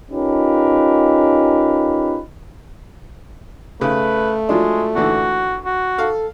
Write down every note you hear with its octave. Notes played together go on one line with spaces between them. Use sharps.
C#4 D#4 F4 G4 A#4 B4
C#3 A3 B4
F3 F#3 G#3 D4
A#2 D3 E3 F#4
F#4
A4 F5